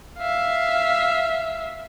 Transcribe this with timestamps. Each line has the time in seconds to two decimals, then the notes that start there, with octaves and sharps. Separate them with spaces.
0.18 E5 F5